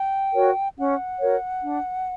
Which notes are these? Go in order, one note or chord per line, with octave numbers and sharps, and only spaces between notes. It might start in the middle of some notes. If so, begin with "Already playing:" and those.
Already playing: G5
F#4 A#4 C#5
C#4 F#5
F#4 A#4 C#5
D4